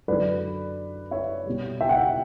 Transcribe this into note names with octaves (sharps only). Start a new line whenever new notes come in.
F#2 D3 F#3 B4 D5
C#5 E5
B2 G3
E5 G5
F#5
E5 G5